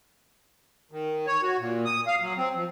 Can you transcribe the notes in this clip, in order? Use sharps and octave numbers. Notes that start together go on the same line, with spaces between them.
D#3
C#5
F#4
A#2
D#6
F5
F#3
C4
F3